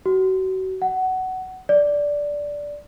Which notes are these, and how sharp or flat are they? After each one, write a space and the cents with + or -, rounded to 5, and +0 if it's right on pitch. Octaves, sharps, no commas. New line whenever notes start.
F#4 +30
F#5 +15
D5 -10